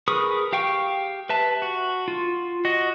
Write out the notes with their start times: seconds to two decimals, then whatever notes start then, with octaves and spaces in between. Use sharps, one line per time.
0.08 G#4 A#4 B4 C#6 D#6
0.53 G4 F5 G5 C#6
1.29 B4 E5 A5
1.62 F#4
2.08 F4
2.65 F#4 D#5